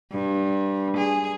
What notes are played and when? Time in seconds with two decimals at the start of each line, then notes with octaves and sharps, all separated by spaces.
0.12 G2
0.97 G#4